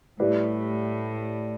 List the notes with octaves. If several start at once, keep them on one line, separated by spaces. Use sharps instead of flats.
A2 G3 E4 G4 B4 D5